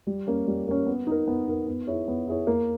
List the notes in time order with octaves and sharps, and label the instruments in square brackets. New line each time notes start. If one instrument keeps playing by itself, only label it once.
[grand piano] G3
A#3 C#4
G3
A#3 C#4
B3
D#4 A#4
B3
D#4 A#4
B3
E4 G#4 C#5
B3
E4 G#4 C#5
A#3